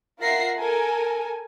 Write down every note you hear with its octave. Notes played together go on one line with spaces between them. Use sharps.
F4 A#4 E5 F#5 A#6 C7
A4 A#4 G#5